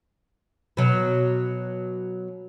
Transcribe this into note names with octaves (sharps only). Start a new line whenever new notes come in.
B2 F#3